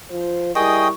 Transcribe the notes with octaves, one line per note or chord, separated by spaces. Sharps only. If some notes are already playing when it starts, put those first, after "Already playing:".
F3 F4 C5
G3 E4 G#4 A#4 D#5 G5 C#6